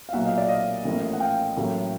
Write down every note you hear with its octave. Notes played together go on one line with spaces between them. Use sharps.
F5
B1 A#2 F#3 A#3 E5 F#5
D#5 F5
D5 E5
D#5 F5
A1 A2 F3 A#3
F#5
F5 G5
A1 A2 F#3 A#3